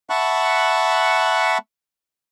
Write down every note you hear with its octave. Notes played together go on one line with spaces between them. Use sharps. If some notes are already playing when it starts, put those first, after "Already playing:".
E5 F#5 A5 B5 C#6 F#6